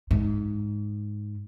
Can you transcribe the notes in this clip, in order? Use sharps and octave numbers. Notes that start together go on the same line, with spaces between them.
G#2